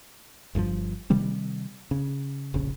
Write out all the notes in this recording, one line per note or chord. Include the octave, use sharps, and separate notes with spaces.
G1 G2 C3 F3
C3 D#3 G3 C4
C#3
F1 A#1 C#3